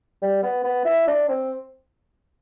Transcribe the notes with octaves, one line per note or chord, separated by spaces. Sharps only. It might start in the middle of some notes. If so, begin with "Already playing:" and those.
G3
B3
B3
E4
D4
C4